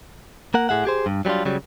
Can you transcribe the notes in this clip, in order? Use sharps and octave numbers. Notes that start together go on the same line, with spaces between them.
A#3 A#4 F#5
A2 G#4 E5 F#5
G4 G#4 C5
G2
F#3 G3 B3 D4 F4
C#3 F#3 G3